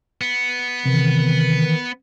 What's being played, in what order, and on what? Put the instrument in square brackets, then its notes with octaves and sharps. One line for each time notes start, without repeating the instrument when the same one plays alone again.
[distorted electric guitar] B3
[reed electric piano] C3 [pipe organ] D#3 E3